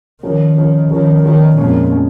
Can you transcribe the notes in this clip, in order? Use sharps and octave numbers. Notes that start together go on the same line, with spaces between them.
D#3 F3 C#4 A#4 C#5
F3 C#4 A#4 C#5
D#3 F3 C#4 A#4 C#5
D#3 F3 C#4 A#4 C#5
F2 A#2 F3 G#3 C#4
F3 G#3 C#4